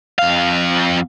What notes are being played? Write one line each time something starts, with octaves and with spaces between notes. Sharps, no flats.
F2 F5